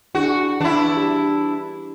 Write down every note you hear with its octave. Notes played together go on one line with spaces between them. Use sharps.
D4 E4 F#4 G#4
E3 D4 E4
G4